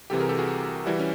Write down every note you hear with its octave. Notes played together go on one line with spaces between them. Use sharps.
C2 C3 E3 G4 A4
G#4 A#4
G4 A4
F#4 G#4
E3 G3 E4 F#4
C#4